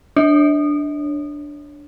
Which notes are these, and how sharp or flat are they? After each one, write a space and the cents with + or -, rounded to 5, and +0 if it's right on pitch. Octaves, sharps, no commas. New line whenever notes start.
D4 +0 C#5 +0